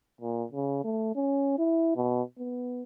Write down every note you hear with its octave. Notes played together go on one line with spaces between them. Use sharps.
A#2
C#3
A3
C#4
E4
B2
B3